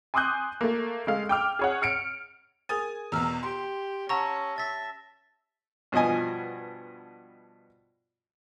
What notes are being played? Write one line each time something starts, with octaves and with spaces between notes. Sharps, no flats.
G#5 C6 D6 D#6 F#6 G6
A3 A#3
G#3 A3 F5
G5 D6 F6
G#4 C#5 F#5
F6 C#7 D7
G#4 A#4 G#5 D#6 A6
E2 B2 A#5 E6 F6
G4 C6
C#4 F#5 A5 A#5 C#6 E6 A#6
E5 A6 B6
G2 B2 F3 D#5 G#5